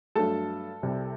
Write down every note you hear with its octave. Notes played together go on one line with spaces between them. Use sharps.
G2 F#3 A3 A4 A5
C2 C3 G3